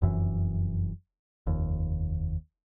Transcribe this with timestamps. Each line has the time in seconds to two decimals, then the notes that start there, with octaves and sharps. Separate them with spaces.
0.02 F1 F#2 E3
1.47 F1 D#2